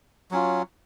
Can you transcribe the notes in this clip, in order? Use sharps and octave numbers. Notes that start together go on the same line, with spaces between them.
F#3 C#4 F4